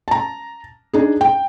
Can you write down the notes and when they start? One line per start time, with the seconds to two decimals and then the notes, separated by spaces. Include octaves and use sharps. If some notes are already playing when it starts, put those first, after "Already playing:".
0.08 A5 A#5
0.93 D4 D#4 G#4
1.21 G5